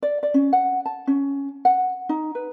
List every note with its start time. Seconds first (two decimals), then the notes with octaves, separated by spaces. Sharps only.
0.03 D5
0.23 D5
0.34 C#4
0.53 F#5
0.86 A5
1.07 C#4
1.65 F#5
2.09 D#4
2.35 B4